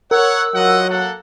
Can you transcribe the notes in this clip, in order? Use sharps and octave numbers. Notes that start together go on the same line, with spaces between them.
A#4 C#5 F#5 E6
F#3 F4 D#5 F#5
A#3 A4 F#5